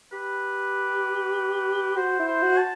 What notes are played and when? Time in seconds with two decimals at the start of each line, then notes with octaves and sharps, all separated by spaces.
0.12 G4 B4
1.96 F#4 C5
2.19 E4
2.27 C5
2.42 F#4
2.58 A5